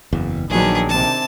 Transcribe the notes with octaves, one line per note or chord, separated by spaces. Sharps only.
F#1 E2
A#1 D#3 F#3 B3 D4 G#4
C3 A5